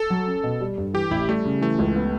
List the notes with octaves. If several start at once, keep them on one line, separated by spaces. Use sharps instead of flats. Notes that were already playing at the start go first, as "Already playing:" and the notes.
Already playing: A4
F#3
C#4
B2
G3
G2
E3 G4
A1 E4
G3 A3
C#3
E3 A3
C#2
B3